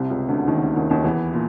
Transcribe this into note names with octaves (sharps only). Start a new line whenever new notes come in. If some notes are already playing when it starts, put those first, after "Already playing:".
Already playing: C2 C3
C#2 C#3
D2 D3
D#2 D#3
D2 D3
D#2 D#3
D#2 D#3
E2 E3
A#2